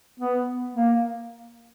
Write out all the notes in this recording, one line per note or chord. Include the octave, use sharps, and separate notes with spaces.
B3
A#3